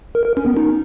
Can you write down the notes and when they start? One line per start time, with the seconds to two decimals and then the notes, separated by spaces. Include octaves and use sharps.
0.15 A#4
0.26 A#4
0.37 C#4
0.46 B3
0.57 D#4